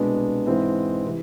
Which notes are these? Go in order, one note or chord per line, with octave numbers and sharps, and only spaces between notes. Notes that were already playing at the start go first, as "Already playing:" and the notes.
Already playing: C2 B2 G#3 B3 D4
G#2 E3 G#3 C4 E4
C3 E3